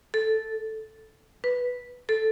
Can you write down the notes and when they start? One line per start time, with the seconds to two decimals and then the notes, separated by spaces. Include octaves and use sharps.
0.14 A4
1.44 B4
2.09 A4